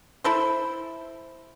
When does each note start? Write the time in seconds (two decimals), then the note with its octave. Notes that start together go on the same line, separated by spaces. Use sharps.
0.24 E4 A4 C5